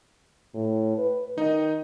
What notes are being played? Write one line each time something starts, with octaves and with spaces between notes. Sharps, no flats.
A2
B4
D#3 D#4 D#5